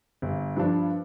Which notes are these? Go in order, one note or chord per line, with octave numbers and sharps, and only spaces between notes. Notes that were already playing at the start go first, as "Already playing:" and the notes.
G1
G2 F3 D4